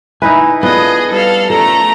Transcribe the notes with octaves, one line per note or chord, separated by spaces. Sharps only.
D#4 E4 B4 E5 G#5
B3 D4 F4 G#4 A4 D#5
F2 G3 E4 A4 B4 F5
D#2 C#3 F3 A3 A4 D5 A#5